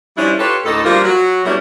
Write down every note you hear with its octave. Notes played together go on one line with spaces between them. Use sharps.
F3 G3 C#4 D4 E4
F4 G4 A4 B4 C#5
D2 A2 D#4 A4
F3 G3 A#3 D4 F4 A#4
F#3 F#4
B2 G3 A3 C#4 D4 E4